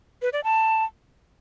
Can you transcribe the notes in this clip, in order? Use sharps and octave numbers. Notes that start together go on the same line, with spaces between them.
B4
D5
A5